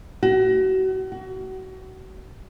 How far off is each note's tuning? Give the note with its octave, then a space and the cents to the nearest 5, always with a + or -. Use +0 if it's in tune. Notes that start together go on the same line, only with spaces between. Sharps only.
F#4 +35
F#4 +30